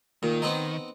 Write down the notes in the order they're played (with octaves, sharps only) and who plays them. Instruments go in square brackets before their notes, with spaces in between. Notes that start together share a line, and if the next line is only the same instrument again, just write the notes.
[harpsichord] A#2 [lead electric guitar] D#3
[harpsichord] B3 C4 D#4